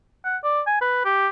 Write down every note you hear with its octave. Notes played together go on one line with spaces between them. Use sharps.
F#5
D5
G#5
B4
G4